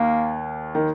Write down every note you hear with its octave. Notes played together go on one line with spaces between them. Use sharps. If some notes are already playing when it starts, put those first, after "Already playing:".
Already playing: D#2 D#3 A#3
D#3